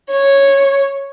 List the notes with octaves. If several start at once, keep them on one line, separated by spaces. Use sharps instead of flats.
C#5